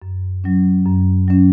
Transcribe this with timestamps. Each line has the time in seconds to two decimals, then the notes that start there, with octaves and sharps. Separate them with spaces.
0.02 F#2
0.44 F#3 C#4
0.86 F#2
1.28 F#3 C#4